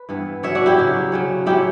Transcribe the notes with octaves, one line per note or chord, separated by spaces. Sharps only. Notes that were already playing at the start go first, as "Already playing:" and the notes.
Already playing: B4
G2 E3 B3
C#3 F#3 C#4 C#5 E5
D4 F#4
E4 G4
C#3 F#3 C#4
C#3 F#3 C#4
C#3 F#3 C#4 E4 G4